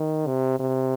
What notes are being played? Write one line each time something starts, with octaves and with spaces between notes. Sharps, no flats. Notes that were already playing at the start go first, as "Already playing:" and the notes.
Already playing: D#3
C3
C3